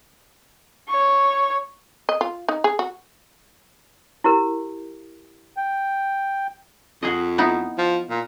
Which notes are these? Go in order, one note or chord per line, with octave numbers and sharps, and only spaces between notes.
C#5 C#6
D#5
F4
D#4
G#4
F#4
E4 G4 A#4
G5
F2 F#4 G#4 D#5
B3 D#4 E4
F3
A#2